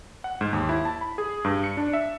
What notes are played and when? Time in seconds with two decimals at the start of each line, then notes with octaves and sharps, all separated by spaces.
0.24 F#5
0.41 G#2
0.53 D#2
0.69 E4
0.85 A5
1.01 B5
1.18 G#4
1.45 G2
1.64 C#7
1.77 D4
1.93 E5